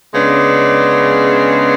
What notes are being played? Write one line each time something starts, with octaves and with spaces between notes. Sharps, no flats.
C#3 G#3 B3 D4